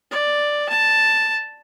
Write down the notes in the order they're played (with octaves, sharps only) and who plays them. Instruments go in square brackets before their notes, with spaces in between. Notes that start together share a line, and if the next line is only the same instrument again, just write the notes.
[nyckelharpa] D5
A5